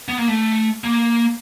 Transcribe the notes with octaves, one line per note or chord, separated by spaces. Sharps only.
B3
A#3
A3
A#3